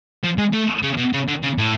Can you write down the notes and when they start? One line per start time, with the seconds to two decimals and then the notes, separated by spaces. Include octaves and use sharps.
0.24 F3
0.38 G#3
0.53 A3
0.83 C#3
0.98 B2
1.13 C#3
1.28 D3
1.43 C#3
1.58 A2